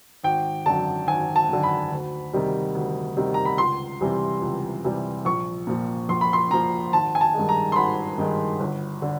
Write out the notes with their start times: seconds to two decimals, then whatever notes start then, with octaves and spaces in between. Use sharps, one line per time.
0.24 G#1 G5
0.66 F#2 D3 A5
1.07 G#1 G#5
1.36 A5
1.49 F#2 D3
1.63 B5
1.91 D2
2.33 C3 D#3 G3
2.75 D2
3.17 C3 D#3 G3
3.34 A#5
3.45 B5
3.58 C#2 C6
4.01 C3 E3 G3
4.42 C#2
4.84 C3 E3 G3
5.25 A#1 C#6
5.67 A#2 F3
6.09 A#1 C6
6.21 B5
6.33 C6
6.50 A#2 F3 A#5
6.93 G#1 A5
7.15 G#5
7.21 A5
7.34 G2 D#3 G#3
7.49 A#5
7.72 C6
7.76 G#1 B5
8.18 G2 D#3 G#3
8.60 G1
9.02 D3